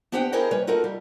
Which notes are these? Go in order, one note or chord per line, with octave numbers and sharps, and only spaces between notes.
B3 D4 G4 C5 F#5 G5
E4 G4 G#4 A#4 C5 D#5
G3 B4 C#5
D#4 F4 F#4 A4 A#4
G3